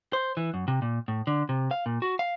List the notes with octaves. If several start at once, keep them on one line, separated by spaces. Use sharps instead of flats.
C5
E3
F#2
C3
A#2
A2
D3
C3
F5
A#2
F#4
F5